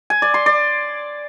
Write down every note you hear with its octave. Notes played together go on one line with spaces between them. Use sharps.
G#5
D5
C6
D5